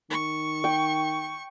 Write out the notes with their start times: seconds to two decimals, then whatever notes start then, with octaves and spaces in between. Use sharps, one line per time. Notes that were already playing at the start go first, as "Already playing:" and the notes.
0.10 D#3 C#6
0.64 G5